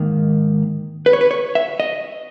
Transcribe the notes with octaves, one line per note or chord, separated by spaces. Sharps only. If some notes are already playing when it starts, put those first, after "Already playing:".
Already playing: G#2 D#3 A#3
B4
C#5
B4
C#5
E5
D#5